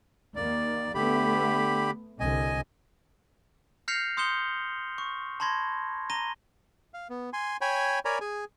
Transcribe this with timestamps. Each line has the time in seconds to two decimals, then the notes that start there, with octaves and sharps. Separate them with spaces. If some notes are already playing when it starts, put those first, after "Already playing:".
0.36 D#2 D#3 A#3 D5
0.94 D3 A3 B3 G4 B5
2.20 C2 D3 D#5 G#5
3.88 F6 G6 A#6 C7 C#7 F7
4.17 C6 D#6 G6 C#7 E7 G7
4.98 C#6
5.40 A5 B5 C6 G#6 A#6
6.10 A#5 A#6 D#7 G7
6.94 F5
7.10 B3
7.33 G#5 C6
7.61 C#5 G5 G#5 B5
8.05 A#4 C#5 D5 G#5 A#5 B5
8.21 G#4 G#5